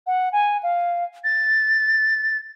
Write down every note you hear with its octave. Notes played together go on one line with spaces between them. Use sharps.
F#5
G#5
F5
A6